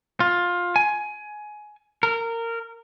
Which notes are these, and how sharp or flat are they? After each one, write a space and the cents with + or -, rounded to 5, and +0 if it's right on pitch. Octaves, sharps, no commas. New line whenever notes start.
F4 +15
G#5 +15
A#4 -20